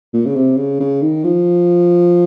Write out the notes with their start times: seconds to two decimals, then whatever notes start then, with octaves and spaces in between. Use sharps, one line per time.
0.13 A#2
0.26 C#3
0.36 C3
0.57 C#3
0.80 C#3
1.02 D#3
1.24 F3